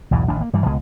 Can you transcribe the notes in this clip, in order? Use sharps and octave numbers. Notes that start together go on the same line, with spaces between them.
B1 E2 G#2 E3
A1 D#3 D4
A#3
G2 E3 G3
C#2 B2 G#3